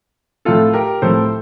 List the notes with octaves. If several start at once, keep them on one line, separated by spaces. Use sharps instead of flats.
A2 F3 A3 C4 F4 A4
G4 A#4
A2 F3 A3 C4 A4 C5